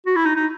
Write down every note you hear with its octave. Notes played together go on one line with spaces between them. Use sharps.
F#4
E4
D#4
D#4